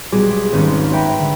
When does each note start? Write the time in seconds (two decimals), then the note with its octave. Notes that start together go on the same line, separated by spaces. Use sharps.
0.12 B1 G3 G#3 G#4 D6 G#6
0.52 G#1 D#2 C4 C#4 B4 F6
0.92 B4 C#5 E5 G5 A#5 B5
1.19 D3